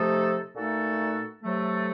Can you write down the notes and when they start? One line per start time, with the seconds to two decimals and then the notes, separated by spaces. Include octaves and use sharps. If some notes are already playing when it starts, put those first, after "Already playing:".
Already playing: C3 F3 A3 D#4 A4
0.56 A#2 A3 D#4 F#4 A4
1.43 C3 F#3 A3